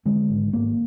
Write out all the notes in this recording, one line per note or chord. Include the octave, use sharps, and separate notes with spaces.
D3 G#3
G#1
G#1 A#3